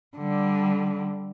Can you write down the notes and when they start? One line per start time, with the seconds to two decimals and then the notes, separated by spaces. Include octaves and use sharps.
0.17 D3 G3